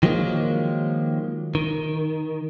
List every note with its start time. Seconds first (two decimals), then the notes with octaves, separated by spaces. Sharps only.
0.03 D#3 F3 F#3 G#3 A#3
1.55 D#3